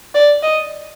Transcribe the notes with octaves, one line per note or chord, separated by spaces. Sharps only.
D5
D#5